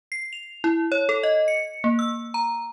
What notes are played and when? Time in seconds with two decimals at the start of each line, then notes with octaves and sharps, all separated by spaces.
0.12 C7
0.33 F7
0.64 E4
0.92 C#5
1.09 A4
1.23 D#5
1.48 C#7
1.84 A#3
1.99 E6
2.34 A#5